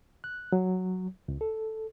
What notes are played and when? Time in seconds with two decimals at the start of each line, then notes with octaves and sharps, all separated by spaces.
0.24 F#6
0.52 F#3
1.28 C#2
1.41 A4